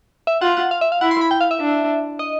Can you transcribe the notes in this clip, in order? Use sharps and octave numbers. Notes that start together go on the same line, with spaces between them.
E5
F4 F#5
F#5
F5
E5
F5
E4 F#5
C6
B5
G5
F5
E5
D4
D#5